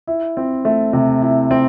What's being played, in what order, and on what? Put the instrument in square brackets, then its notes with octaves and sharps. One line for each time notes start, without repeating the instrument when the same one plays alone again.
[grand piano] E4
C4
A3
C3
E4
C4